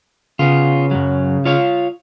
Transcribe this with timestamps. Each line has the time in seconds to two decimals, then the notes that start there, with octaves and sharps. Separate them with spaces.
0.39 C#3 B3 F4
0.91 F#2 F#3
1.45 F4 C#5 F5